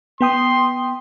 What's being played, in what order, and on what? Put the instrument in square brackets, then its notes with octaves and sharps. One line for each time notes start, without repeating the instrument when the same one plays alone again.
[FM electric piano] B3 G5 D#6 [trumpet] C6